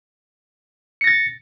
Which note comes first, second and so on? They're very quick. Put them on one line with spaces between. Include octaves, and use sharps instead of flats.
C#7 A#6 A6